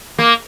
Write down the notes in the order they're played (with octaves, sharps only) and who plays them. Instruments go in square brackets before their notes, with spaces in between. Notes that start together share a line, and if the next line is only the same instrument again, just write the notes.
[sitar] A#3